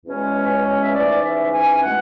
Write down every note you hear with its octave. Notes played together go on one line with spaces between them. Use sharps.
E2 B2 G#3 C#4
B4
C#5
E5
G#2 E3 A3 C#4 D5
E5
G#5
B2 G#3 F#5